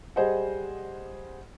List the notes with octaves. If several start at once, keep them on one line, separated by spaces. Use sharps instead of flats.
G3 G#4 C5 D#5 F#5